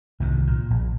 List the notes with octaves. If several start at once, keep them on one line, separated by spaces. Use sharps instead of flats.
C2 G#2 D#3
A#2
A#1